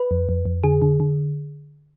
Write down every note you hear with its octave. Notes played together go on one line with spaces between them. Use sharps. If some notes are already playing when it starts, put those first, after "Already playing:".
Already playing: B4
F2
F2
F2
D3 G#4
D3
D3